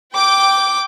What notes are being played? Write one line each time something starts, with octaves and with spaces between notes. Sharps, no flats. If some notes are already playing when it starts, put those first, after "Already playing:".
G5 D6